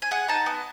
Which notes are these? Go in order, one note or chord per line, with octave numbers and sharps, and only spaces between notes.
G#5
G#4 F#5
D#4 A5
B3